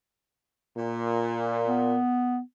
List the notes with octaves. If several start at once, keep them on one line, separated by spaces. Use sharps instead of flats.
A#2
B3